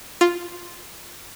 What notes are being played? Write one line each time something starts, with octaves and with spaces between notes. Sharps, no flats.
F4